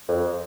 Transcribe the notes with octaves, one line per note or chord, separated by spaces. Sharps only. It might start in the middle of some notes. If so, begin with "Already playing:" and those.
F2